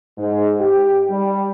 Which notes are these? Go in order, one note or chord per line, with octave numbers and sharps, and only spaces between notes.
G#2
G4
G3